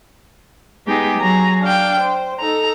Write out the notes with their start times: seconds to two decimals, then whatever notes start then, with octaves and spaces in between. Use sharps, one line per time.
0.86 G#3 B3 D#4 G4 G#4
1.17 F#3 G#4 A#5
1.60 D4 F5 G5
2.00 C5
2.38 D#4 A4 A#5